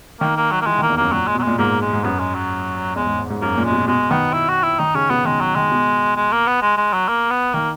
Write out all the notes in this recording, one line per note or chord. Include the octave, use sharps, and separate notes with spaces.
D#3 A#3
A#3
F#3
A#3
E3 G#3
D#3
A#3
E2
F#2 A#3
A#2 F#3
G#3
B2 F#3
A#2 G#3
G#2 A#3
G#3
G#2
F#2 B3
G#3
F#3
E2 G#3
G#2
G#2
G#2
F#2 A#3
A#2
G#3
B2
B2 G#3
D#3 B3
E4
F#4
E4
D#3 D#4
C#3 C#4
B2 B3
D#3 G#3
F#3
D#3 G#3
B2
G#3
A#3
B3
G#3
G#3
F#3
A#3
B3
D#3 A#3